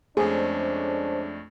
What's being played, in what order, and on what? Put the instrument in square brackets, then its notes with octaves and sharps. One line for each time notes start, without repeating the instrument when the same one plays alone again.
[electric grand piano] F2 A3 [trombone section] G#3 C#4 D4 [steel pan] G#4 [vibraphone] C5